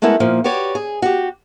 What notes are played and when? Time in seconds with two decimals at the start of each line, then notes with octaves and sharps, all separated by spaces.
0.02 G#3 A3 B3 E4 A#4
0.20 A#2 F3 A#3
0.44 F#4 G4 B4 C#5 D5
0.75 G#4
1.02 F#4 G4